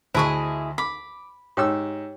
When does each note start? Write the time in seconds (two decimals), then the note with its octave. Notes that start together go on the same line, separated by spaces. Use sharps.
0.15 D2 E4 G#4 C5 D#5 A5 C#6
0.78 B5 D6
1.57 G#2 G4 C#5 G5 E6